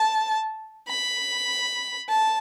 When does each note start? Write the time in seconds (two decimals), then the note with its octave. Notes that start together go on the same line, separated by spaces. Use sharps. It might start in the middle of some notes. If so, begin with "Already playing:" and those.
Already playing: A5
0.88 B5
2.09 A5